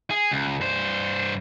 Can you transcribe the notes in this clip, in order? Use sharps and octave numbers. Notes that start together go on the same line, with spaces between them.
G#4
C#2
G2 C5